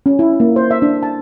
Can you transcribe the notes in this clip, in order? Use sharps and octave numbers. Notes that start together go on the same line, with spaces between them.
C#4
E4
A#3
C5
E5
D4
A5